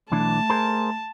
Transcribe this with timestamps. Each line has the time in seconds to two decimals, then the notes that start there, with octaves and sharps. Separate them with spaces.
0.12 B1 E3 A3 D4 A5
0.50 G#4 A#4 C5